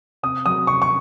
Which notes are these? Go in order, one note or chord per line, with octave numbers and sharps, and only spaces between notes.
C3 D#6
F#3 D#6
C3 C#6
C#6